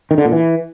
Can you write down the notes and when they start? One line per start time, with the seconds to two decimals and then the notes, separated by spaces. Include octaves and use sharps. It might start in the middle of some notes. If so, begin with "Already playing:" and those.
0.11 D#3
0.18 D3
0.25 A#2
0.32 E3